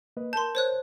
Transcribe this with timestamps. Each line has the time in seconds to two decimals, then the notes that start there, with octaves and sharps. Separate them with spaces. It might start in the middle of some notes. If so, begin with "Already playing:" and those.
0.17 A#3 B4 D#5
0.33 A#4 A5 C6 G6
0.55 C5 C#5 F#6